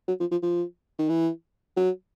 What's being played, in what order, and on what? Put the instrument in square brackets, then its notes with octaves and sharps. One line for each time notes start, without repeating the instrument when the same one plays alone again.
[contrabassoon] F#3
F3
F3
F3
D#3
E3
F#3